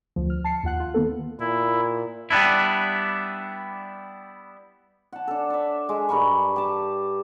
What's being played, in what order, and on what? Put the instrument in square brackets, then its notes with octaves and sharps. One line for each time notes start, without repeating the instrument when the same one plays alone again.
[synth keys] D2 F3
F6
A5 C7 C#7
D#2 F4 F#5 F#6
F4
D#3 A#3 B3 A4
[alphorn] A#2 [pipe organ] E4
[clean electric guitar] G3 B3 D4 E4
[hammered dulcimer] F#5 A5
D4 A4
D5 E5
G#3
G2 A#4 B5 C#6
G4 A5